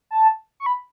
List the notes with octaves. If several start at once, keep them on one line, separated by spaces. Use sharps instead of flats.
A5
C#6
B5